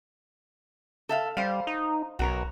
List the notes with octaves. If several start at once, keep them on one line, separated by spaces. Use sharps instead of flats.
A4 E5 F5
G3 C5 F5
D#4
B1 F#4 A#4 C#5